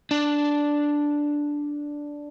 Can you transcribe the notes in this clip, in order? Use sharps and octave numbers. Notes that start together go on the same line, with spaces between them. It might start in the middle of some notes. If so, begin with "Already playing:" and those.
D4